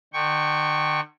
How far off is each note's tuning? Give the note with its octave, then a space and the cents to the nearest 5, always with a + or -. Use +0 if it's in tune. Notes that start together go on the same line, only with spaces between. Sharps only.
D3 +45 G5 +5 C#6 +0